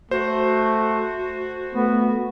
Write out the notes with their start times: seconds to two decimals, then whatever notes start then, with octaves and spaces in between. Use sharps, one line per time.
0.11 A3 F#4 C5
1.75 A3 B3